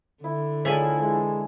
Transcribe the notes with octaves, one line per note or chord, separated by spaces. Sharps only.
D3 E4
D2 D#3 F3 C#4 D4 E4 G#4 E5
E3 G#3